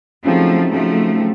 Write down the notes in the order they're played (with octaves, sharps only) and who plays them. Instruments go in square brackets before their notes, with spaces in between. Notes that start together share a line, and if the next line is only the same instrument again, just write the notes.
[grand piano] C#3 F#3 C4 D#4 [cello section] F3 A3
[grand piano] C#3 F#3 C4 D#4 [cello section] F3 A3
[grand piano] C#3 F#3 C4